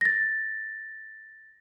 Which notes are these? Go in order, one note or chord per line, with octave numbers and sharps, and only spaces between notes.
A6 A#6